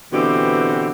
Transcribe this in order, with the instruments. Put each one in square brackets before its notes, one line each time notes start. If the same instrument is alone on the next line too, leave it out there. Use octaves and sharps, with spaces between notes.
[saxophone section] B2 D3 E3 C4 G4